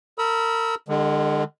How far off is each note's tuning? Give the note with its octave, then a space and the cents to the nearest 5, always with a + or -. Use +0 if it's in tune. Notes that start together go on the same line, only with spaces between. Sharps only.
A#4 -35 B5 -30 E6 -30
D3 +40 G#3 -20